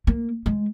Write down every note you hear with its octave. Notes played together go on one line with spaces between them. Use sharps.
A#3
G#3